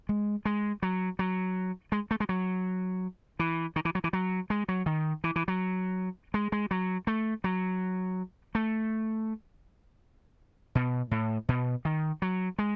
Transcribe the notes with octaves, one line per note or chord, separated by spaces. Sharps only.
G#3
G#3
F#3
F#3
G#3
A3
G#3
F#3
E3
D#3
E3
F#3
E3
F#3
G#3
F#3
D#3
E3
E3
F#3
G#3
G#3
F#3
A3
F#3
A3
B2
A2
B2
D#3
F#3
G#3